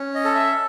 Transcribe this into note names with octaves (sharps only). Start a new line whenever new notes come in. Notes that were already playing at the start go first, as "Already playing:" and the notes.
Already playing: C#4
D#5
A4
E5